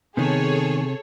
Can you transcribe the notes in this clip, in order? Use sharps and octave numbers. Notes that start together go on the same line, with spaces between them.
C3 D#3 B3 G#4 A4 C#5